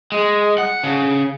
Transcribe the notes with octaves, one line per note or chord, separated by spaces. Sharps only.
G#3
F#5
C#3